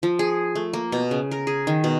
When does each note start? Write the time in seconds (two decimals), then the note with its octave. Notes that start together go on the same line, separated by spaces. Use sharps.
0.03 F3
0.19 G#4
0.55 A3
0.73 A#3
0.92 B2
1.11 C#3
1.31 A#4
1.47 G#4
1.67 D#3
1.84 B2